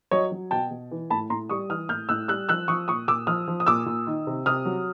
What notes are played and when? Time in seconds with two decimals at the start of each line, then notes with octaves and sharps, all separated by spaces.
0.11 F#3 C#5 D#5
0.32 F#3
0.51 B2 G5 A5
0.71 B2
0.91 E3
1.10 A2 A5 B5
1.30 A2 A#5 C6
1.49 G3 C#6 D#6
1.69 E3 D#6 F6
1.89 A2 F6 G6
2.09 A2 E6 F#6
2.28 G3 E6 F#6
2.49 F3 E6 F#6
2.68 F3 C#6 D#6
2.88 A#2 C#6 D#6
3.08 A#2 D6 E6
3.27 F3 D#6 F6
3.48 F3
3.60 D#6
3.67 A#2 D6 E6
3.86 A#2
4.07 D#3
4.27 C3
4.46 C3 D#6 F6
4.66 F#3